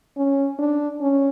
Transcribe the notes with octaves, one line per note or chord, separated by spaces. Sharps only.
C#4
D4
C#4